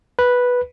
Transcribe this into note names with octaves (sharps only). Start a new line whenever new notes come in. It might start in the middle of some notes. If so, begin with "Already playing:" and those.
B4